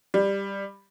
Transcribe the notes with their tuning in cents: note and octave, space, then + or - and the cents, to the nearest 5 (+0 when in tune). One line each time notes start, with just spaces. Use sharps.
G3 +10